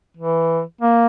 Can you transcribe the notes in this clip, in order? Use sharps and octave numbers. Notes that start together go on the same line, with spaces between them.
E3
A#3